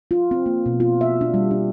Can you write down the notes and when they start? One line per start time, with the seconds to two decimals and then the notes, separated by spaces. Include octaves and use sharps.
0.11 F4
0.31 C4
0.46 A#3
0.66 B2
0.80 F4
1.01 E5
1.21 D4
1.34 G3
1.51 D4